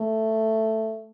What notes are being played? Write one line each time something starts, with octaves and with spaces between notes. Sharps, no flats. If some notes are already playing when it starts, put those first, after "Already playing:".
Already playing: A3